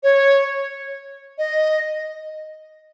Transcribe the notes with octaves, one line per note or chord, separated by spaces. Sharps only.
C#5
D#5